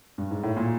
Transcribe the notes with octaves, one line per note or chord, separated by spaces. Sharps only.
G2
G#2
A2
A#2